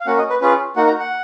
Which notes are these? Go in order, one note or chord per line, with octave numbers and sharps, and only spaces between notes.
F5
A#3 C#4 F#4 F#5
D#5
B4
C#4 F4 G#4 B4
A#3 D#4 F#4 F#5
A#5
F#5